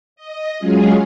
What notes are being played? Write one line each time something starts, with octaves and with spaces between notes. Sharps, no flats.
D#5
F#3 G#3 C#4 F4 G#4